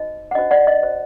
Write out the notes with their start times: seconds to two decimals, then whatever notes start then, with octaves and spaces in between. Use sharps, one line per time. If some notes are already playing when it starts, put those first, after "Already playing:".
Already playing: D#4 F#4 C5 D#5
0.31 F#5
0.35 D4 F#4 C5 D#5
0.51 D5 F#5
0.67 D#5
0.83 F#4 C5